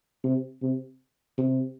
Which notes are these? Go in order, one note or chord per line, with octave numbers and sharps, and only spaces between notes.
C3
C3
C3